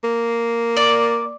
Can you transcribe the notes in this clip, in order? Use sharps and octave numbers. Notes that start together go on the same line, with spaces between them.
A#3
D5